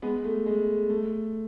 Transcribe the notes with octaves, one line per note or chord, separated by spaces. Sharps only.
G#3 B3
A3
G#3
A3